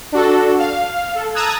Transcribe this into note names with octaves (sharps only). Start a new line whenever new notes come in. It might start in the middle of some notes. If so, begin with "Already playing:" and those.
D4 F#4 A4
F5
A4
A5 A#5 D#6 E6 F#6 G#6